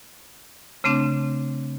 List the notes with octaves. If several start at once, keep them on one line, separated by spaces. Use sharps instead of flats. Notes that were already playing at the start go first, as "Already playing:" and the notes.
C#3 A3 C4 D4